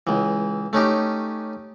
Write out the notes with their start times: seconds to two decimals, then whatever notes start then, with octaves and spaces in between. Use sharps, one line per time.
0.07 C#2 E3
0.73 A3 C#4 D#4 G4